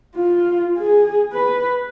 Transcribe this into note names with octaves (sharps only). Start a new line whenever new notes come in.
F4
G#4
B4